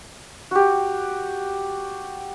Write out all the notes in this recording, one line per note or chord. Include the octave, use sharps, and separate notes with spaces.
F#4 G4